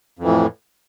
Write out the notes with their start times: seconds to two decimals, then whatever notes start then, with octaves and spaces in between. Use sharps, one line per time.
0.19 F2
0.23 E3
0.27 A2